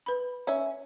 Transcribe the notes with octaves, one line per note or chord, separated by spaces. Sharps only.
B4 B5
C#4 E5